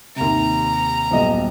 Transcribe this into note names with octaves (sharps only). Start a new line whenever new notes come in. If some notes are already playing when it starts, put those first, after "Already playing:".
D#2 C3 A#5
D#1 B1 D#5